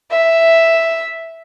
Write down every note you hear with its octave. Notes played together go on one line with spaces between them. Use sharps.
E5